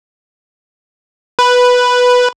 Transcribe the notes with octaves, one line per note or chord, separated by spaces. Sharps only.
B4